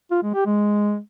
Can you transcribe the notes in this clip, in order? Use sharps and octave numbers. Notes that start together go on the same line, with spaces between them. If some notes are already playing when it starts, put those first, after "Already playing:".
F4
G#3
G4
G#3